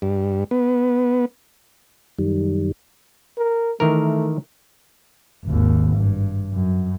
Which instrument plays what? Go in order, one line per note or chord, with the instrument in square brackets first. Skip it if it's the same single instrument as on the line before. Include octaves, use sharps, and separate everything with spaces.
[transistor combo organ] G2
B3
[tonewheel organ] F#2 D#3 G3
[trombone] A#4
[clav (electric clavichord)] D#3 E3 A#4 [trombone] A3
[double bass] G#1 D#2
G2
F#2